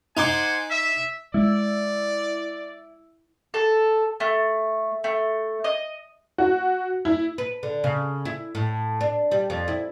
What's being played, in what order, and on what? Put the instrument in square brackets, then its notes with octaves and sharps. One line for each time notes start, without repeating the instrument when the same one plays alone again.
[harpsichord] D#4 C6 D6 [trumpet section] C5 F#5 G#5
[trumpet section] E5
[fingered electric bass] G#3 [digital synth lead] E4 [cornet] D5
[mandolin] A4
A3
A3
D#5
[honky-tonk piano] F#4
E4
[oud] B4
D3
C#3
E4
A2
D4
G3
F2
E4